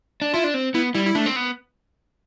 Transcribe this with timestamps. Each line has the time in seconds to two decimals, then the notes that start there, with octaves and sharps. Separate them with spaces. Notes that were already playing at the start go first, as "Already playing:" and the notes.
0.22 D4
0.34 E4 F4
0.44 D4
0.54 C4
0.74 B3 E4
0.95 G3 E4
1.07 E4
1.15 A3 D4
1.26 C4
1.36 B3